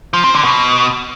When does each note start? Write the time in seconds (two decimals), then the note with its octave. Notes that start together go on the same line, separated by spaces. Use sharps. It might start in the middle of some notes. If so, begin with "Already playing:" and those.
0.13 F3
0.24 C4
0.34 D3
0.44 B2